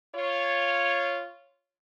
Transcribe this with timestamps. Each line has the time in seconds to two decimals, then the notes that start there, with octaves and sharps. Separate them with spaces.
0.16 F4 C#5